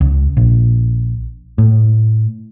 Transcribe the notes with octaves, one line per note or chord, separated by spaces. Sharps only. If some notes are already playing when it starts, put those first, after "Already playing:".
C#2
A#1
A2